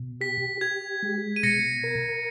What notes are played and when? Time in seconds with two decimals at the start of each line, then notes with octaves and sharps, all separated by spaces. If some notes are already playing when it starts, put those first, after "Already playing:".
Already playing: B2
0.21 G4 B6
0.61 G4 G#6
1.03 G#3
1.36 D#7
1.43 B2 A#6 C#7
1.83 A#4